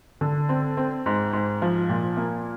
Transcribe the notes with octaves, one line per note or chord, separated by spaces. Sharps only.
D3
C4
C4
G#2
G#2
F3
A#2
A#3